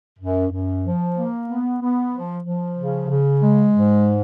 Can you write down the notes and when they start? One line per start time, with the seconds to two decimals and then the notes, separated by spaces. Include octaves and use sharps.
0.19 F#2
0.51 F#2
0.84 F3
1.17 A#3
1.48 B3
1.81 B3
2.12 F3
2.44 F3
2.77 C#3
3.09 C#3
3.41 G#3
3.73 G#2